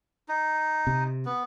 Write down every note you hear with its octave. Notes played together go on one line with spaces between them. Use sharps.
D#4
C3
B3